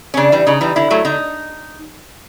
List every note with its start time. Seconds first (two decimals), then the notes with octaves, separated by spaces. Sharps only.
0.14 C#4
0.17 C#3 D4
0.32 E3 G3
0.47 C#3 D#4
0.61 E3 G3
0.76 D3 E4
0.90 F#3 A3
1.05 D3 D#4